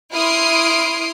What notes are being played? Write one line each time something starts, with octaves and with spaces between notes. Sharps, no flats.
E4 C6 D#6 F6 C7 D7